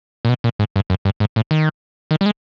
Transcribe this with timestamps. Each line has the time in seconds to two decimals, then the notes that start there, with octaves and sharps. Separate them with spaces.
0.25 A#2
0.29 B2
0.44 A#2
0.59 G#2
0.76 G2
0.90 F#2
1.05 G2
1.20 G#2
1.36 A2
1.51 D#3
2.11 D#3
2.21 G3
2.26 G#3